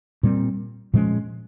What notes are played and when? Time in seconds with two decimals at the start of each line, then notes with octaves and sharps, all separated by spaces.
0.23 A#2 G3 C4
0.94 A#2 F3 G#3 C#4